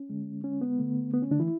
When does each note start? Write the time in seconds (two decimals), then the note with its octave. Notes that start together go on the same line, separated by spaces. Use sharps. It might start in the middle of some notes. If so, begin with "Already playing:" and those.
Already playing: C#4
0.10 D3 G#3
0.44 C#4
0.61 B3
0.79 D3 A3
1.14 B3
1.22 C#4
1.31 D3 D4
1.39 E3 E4